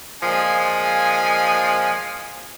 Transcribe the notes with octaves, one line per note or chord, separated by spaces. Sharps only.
A#2 F3 G#3 G#5